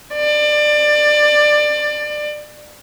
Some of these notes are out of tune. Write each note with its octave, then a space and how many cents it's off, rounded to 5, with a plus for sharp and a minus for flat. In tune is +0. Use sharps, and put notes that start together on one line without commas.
D5 +25